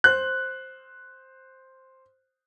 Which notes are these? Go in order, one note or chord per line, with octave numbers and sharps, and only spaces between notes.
C5 F#6